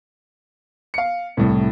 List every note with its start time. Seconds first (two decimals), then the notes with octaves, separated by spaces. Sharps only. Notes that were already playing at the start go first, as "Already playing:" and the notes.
0.94 F5 C#7
1.37 C2 A2